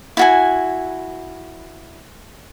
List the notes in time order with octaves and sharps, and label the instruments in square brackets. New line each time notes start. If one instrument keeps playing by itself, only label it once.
[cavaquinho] E4 F#4 G#5